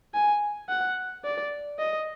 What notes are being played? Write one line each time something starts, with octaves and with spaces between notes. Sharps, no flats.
G#5
F#5
D5
D#5